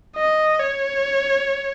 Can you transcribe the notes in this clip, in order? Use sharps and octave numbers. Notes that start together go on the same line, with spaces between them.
D#5
C#5